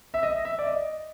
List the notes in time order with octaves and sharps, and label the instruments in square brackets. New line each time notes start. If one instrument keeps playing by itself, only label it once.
[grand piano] E5
D#5
E5
D5
D#5